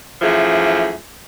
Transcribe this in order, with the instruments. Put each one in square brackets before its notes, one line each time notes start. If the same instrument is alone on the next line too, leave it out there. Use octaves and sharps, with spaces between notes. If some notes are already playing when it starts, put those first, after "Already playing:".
[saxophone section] F#2 E3 F3 A3 G#4